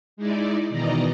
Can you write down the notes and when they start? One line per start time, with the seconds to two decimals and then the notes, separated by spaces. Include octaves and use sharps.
0.17 G#3 D#4 E4 D5
0.69 B2 D#3 E3 D5 D#5 A#5